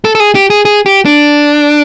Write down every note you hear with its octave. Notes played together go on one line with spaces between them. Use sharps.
A4
A4
G#4
G4
G#4
G#4
G4
D4